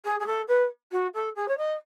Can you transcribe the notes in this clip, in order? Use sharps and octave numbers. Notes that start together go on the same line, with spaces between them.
G#4
G#4
A4
B4
F#4
A4
G#4
C#5
D#5